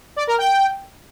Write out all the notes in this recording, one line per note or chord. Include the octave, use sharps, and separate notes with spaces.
D5
A#4
G5